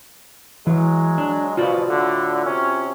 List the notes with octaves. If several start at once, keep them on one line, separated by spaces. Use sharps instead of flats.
E3 F#3 G#3
D4
A1 B2 F3 F4 F#4 D5
A2 D3
C3 C#4